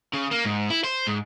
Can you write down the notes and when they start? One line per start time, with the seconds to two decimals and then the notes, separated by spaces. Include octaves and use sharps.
0.14 C#3
0.31 A#3
0.45 G#2
0.70 E4
0.84 C5
1.07 G#2